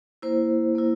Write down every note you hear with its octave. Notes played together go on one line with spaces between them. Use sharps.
A#3 E4 C5
A#3 E4